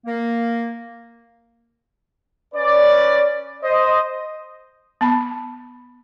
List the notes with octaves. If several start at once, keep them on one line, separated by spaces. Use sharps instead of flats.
A#3
C#4 B4 D5
C5 D#5
B3 A5 B5